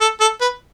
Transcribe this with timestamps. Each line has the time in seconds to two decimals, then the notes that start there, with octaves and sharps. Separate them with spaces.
0.01 A4
0.21 A4
0.41 B4